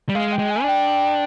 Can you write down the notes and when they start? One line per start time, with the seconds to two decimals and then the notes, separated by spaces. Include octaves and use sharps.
0.09 G3
0.15 G#3 F5
0.33 G5
0.39 G#3
0.51 G#5
0.62 D4
0.68 G5